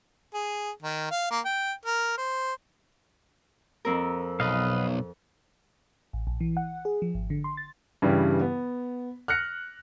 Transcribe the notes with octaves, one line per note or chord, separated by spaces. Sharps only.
G#4
D#3
F5
A#3
G5
A#4
C5
F2 C4 A#4
B1 B4 D#5 F5
A1
A#1
E3
F#5
G#4
F3
G#1
D3
C6
A6
G2 C#3 E3 G3
B3
F6 F#6 A#6 C#7